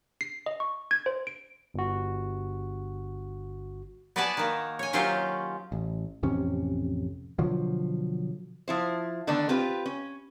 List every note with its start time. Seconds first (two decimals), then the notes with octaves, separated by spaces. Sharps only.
0.21 C7
0.46 D#5
0.60 C#6
0.91 G#6
1.06 C5
1.27 D7
1.74 G1 F#4
4.16 B3 F#4 B4 D5 G#5 A5
4.37 D#3 A#3
4.79 C#5 G#5
4.93 D#3 F#3 C#4 F4 G4 C5
5.72 A1
6.23 A1 F2 C3 C#4
7.38 B2 D3 F3 F#3
8.68 F3 E4 C5
9.27 D3 D#3 A3 B3 D4
9.49 C4 F4 G4 B4
9.86 C#4